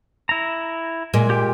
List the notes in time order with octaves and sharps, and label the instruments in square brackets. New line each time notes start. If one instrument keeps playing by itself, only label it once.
[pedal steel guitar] E4 A#5
[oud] A#2 G#3
[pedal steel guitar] G4 G5